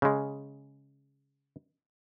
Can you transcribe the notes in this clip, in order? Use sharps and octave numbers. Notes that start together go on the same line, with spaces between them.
C#3 G#3